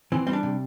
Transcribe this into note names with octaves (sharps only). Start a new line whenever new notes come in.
E3 C4
G3 C4
D4
C3